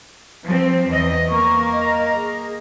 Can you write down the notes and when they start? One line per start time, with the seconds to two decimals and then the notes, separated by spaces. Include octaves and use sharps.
0.44 F3 C4
0.87 E2 E3 D#5
1.29 A#3 A#4 C#6
1.72 D#5
2.14 G#4